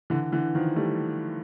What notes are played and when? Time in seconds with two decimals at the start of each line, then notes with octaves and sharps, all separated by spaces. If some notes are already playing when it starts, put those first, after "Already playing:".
0.10 D3 E3
0.32 D3 E3
0.55 D#3 F3
0.76 G3 A3